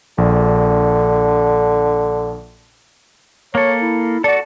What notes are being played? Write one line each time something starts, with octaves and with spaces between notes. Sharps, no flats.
A#1 D3
A#3 A4 C#5
E4
F#4 A4 D5